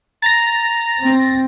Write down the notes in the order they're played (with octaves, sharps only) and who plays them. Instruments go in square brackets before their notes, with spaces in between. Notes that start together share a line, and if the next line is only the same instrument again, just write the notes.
[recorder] A#5 [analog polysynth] A6 A#6
[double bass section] C4